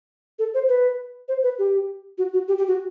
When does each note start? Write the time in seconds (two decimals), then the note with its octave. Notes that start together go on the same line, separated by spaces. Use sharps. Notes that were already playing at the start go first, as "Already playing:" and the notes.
0.39 A4
0.54 C5
0.69 B4
1.28 C5
1.43 B4
1.59 G4
2.18 F#4
2.33 F#4
2.48 G4
2.58 G4
2.67 F#4